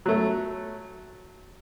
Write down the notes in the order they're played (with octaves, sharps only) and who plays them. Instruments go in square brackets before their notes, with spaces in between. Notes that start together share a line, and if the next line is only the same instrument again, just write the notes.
[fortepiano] F#3 A3